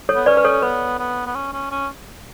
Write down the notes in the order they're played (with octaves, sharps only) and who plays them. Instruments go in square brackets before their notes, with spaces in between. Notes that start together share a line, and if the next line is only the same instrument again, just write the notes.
[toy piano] A4 C#5
[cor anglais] B3
[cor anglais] C#4 [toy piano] B4 D5
[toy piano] B4
A4 C#5
[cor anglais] B3 [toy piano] B4
[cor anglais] B3
B3
C#4
C#4
C#4